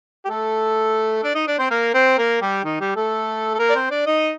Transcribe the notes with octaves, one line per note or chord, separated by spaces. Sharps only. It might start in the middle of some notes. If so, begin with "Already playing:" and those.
G4
A3 A4
D4 D5
D#4 D#5
D4 D5
C4 C5
A#3 A#4
C4 C5
A#3 A#4
G3 G4
D#3 D#4
G3 G4
A3 A4
A4
A#3 A#4
D5
C4 C5
D4 D5
D#4 D#5